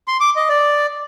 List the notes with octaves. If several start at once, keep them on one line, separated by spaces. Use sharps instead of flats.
C6
D6
D#5
D5